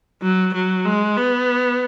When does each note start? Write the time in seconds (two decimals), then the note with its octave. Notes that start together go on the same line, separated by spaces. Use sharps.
0.22 F#3
0.54 F#3
0.86 G#3
1.17 B3